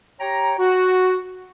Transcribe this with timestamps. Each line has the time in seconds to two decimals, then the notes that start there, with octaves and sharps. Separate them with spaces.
0.20 G4 C#5 G5 A#5
0.59 F#4